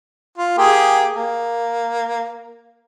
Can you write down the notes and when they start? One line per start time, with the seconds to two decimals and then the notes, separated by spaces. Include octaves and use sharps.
0.38 F4
0.58 A#3 G4 G#4
1.12 A#3